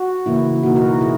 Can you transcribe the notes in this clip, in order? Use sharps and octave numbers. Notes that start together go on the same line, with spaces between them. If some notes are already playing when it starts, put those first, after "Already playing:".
Already playing: F#4
C#3 E3 A#3 E4
B2 A#3 D#4 F#4
F#4 A#4
B2 E4 G#4